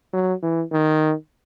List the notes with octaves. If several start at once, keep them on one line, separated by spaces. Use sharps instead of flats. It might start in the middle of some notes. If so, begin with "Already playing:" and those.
F#3
E3
D#3